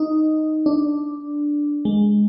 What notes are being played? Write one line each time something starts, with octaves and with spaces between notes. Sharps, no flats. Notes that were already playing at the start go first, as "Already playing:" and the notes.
Already playing: D#4
D4
G#3